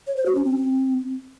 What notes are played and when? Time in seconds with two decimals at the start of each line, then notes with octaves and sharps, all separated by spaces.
0.07 C#5
0.16 C5
0.26 F#4
0.35 C#4
0.45 C4